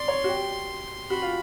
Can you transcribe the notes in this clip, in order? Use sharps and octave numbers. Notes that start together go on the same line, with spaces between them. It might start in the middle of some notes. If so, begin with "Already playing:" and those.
Already playing: D5 C6
C#5
F#4
G4
F#4 B5
F4